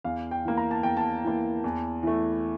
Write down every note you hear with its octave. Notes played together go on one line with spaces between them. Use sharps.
E2 F5
G5
E3 A#3
A#5
A5
E2 G5
A5
E3 A#3
E2
E3 A3